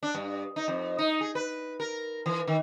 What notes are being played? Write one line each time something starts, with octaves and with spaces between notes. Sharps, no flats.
D4
G2
D#4
F2
D#4
G#4
B4
A#4
E3
D#3